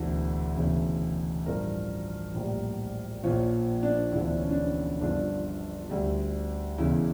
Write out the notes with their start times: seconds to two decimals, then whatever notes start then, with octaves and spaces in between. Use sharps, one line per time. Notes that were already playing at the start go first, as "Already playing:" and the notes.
Already playing: E1 D2 D3 E4
0.57 E1 D2 C#3
1.46 A1 G2 F3 A#4
2.34 A#1 A2 G3
3.23 A#1 A#2 F3 C#5
3.83 D4
4.12 E1 D2 D3 F3 E4
4.25 D4
4.38 C#4
4.50 D4
5.01 G1 G2 D3 F3 D4
5.90 D2 D3 G3
6.78 E1 E2 C#3 E4